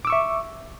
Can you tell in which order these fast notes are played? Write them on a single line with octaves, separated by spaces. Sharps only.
D6 E6 C#6 E5